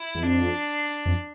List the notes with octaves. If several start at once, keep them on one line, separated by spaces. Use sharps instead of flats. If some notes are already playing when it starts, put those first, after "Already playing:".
Already playing: E4
E2
F2 D4
F2